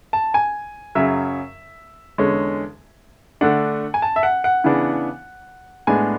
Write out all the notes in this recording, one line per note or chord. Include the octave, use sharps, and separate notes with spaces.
A5
G#5
F#2 C#3 F#3 E5
E2 D3 G#3 C#4
D3 A3 D4 F#5
G#5
A5
E5
F#5
F#5
C#3 E3 B3 D4
A2 G#3 B3 D4 G#5